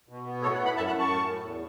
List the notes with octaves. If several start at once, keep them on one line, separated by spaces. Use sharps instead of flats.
B2
B3
A2 A4 C#5
C#5 F#5
A2
F#5 B5
F#2 E5 A5
F#5 B5
F#2
A5 C#6
A2
A2
E2